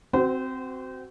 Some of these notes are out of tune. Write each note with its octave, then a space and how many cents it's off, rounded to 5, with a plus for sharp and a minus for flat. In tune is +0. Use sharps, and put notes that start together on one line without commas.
C4 +0 F#4 +20 C5 -30